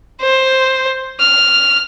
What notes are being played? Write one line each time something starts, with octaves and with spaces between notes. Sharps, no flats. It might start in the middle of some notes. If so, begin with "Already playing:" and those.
C5
F6